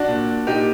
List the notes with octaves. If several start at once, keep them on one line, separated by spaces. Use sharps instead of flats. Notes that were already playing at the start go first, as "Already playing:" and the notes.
Already playing: D4 F#4
A#2
A#2 D#4 G4